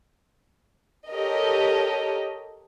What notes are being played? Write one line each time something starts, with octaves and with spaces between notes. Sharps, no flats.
G4 A4 A#4 C#5 D#5